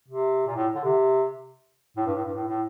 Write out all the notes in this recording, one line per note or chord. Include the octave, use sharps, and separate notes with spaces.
C3
A#2
A2
D3
C3
A2
G2
A2
G2
A2
A2